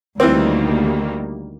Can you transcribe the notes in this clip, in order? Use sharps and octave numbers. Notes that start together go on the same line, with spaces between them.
D2 D#3 E3 G3 A#3 C4